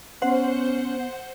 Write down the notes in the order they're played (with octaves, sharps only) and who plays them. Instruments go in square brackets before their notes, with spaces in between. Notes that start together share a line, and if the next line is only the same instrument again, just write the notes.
[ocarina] B3 [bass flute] C#4 [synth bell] C5 F#5